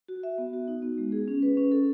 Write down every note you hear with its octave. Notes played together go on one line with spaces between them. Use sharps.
F#4
E5
B3
F#4
D#4
B3
G#3
G#4
C#4
B4
C#4
A4